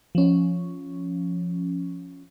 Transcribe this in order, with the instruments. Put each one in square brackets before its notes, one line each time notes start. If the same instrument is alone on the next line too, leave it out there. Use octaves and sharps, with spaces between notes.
[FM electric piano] F3 C#4